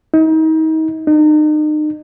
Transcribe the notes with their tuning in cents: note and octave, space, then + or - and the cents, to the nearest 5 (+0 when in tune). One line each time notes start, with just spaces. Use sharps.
D#4 +35
D#4 -35